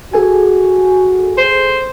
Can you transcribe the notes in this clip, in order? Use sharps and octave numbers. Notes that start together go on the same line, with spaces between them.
F#4 G#4 A4 G#5
C5